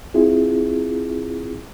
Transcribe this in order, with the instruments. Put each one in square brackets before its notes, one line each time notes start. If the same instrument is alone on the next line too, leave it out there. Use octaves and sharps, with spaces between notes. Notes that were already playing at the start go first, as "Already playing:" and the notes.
[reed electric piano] C4 E4 F4 G#4